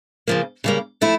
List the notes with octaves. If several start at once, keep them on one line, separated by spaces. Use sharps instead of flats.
C#3 F3 A#3
C#3 G3 A#3
F3 A3 E4